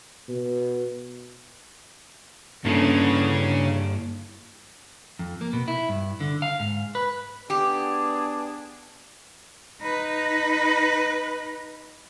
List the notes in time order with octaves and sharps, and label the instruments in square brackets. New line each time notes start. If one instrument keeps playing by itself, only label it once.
[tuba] B2
[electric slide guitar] G2 A4 [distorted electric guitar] C#3 [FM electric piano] A#3 D4 E4
[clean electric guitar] F2
A#3
B2
E4
G2
D3
F5
G#2
B4
[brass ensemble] B3 D4 G#4 [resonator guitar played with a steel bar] G4
[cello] D#4 B4